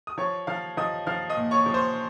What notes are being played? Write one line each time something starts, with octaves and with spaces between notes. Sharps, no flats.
D#6
F3 C#5 C#6
F3 F5 F6
F3 D#5 D#6
F3 F5 F6
D#5 D#6
A#2
C#5 C#6
F3
C5 C6